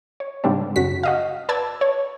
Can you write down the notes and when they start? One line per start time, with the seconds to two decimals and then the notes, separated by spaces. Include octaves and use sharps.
0.20 C#5
0.44 G#2 C#3 G3 C4 D4
0.76 F#2 C#3 F#4 B6
1.03 F#4 D#5 F5
1.49 B4 D5 A5 E6 G#6
1.81 C#5